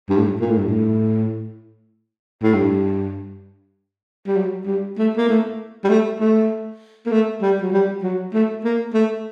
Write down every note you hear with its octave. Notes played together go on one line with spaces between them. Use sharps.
G2
A2
G2
A#2
A2
G2
A2
A2
G2
G3
F#3
G3
A3
A#3
A3
G3
A3
A3
A#3
A3
G3
F#3
G3
F#3
A3
A#3
A3